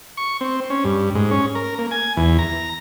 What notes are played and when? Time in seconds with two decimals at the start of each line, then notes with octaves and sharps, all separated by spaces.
0.17 C#6
0.41 C4
0.70 C#4
0.84 G2
1.15 G#2
1.31 C#4
1.55 A#4
1.78 A#3
1.91 G#5
2.17 E2
2.39 A#5